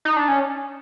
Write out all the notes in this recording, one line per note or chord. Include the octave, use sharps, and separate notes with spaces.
D#4
D4
C#4